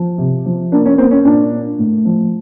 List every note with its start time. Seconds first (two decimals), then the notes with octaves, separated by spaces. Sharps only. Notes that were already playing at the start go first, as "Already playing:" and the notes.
Already playing: F3
0.18 C3
0.46 F3
0.72 A#3 D4
0.86 C#4
0.98 A#3 C4
1.11 C#4
1.25 A#2 D4
1.52 A#3
1.79 A2
2.05 F3